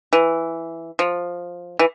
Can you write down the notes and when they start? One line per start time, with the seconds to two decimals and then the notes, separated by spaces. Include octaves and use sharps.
0.13 E3
0.99 F3
1.79 E3